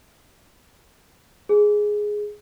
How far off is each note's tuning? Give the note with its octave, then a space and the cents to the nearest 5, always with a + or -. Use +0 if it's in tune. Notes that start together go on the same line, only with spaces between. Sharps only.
G#4 +5